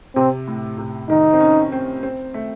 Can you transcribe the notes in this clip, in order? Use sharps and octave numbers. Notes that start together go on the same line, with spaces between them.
C3 C4
A2
C3
D#3 D#4
C4
C#4
C4
C4
A3